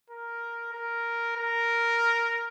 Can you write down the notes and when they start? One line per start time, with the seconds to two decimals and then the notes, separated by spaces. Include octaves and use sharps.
0.10 A#4
0.73 A#4
1.37 A#4